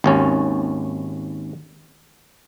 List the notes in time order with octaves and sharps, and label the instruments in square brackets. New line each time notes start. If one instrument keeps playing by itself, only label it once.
[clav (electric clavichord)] G#1 D#2 C#4